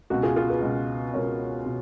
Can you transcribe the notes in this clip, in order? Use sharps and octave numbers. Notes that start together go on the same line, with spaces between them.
C#2 B2 F#4
F4 G#4
F4 G#4
G#4 B4
C#2 B2
C#2 B2 A#4 C#5
B2